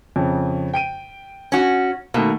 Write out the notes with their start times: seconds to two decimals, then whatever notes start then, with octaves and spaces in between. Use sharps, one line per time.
0.16 F2 C#3
0.74 G5 D7 D#7
1.52 C#4 F#4
2.14 B2 D#3 A3 A#3